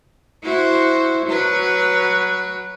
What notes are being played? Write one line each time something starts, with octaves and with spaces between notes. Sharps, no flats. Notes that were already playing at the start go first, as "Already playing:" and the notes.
E4 F#4 C5
F#3 B4